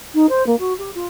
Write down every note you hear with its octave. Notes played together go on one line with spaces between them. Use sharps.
D#4
C5
A#3
F#4
G4
F4